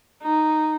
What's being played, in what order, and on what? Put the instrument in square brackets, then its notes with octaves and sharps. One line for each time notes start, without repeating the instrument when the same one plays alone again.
[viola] D#4